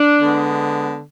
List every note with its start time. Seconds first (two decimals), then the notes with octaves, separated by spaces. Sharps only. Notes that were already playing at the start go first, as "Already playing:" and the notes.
Already playing: D4
0.19 D3 G#3 B3